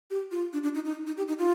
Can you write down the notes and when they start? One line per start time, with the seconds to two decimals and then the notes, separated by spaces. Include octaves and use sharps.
0.10 G4
0.31 F4
0.53 D4
0.63 D4
0.75 D#4
0.85 D#4
1.07 D#4
1.17 G4
1.28 D#4
1.39 F4